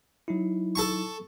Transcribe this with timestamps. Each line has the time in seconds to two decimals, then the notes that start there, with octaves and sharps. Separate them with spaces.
0.28 F#3 D#4 E4
0.75 A4 A5 C#6